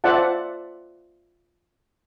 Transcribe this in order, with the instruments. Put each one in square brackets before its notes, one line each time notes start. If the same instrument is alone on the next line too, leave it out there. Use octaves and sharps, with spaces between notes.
[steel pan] F4 C5 D5 E5 F#5 A5